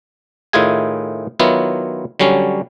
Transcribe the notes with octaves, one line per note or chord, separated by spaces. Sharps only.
A2 D#3 E4 F4 G#4 G#5
D#3 F#3 B3 E4 F4
D3 F#3 G3 C#4